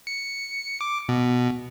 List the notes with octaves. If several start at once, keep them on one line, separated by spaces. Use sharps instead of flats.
C#7
D6
B2